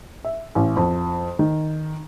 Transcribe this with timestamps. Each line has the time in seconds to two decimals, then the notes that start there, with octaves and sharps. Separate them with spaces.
0.25 E5
0.55 A1
0.77 F2
1.39 D#3